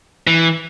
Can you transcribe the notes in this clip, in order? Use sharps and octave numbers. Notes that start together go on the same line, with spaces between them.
E3